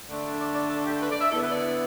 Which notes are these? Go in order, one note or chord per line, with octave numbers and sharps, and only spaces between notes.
D3 A3 D4
D5
D5
A4
G4
B4
D5
E5
D3 B3 E4 A4
B4
D5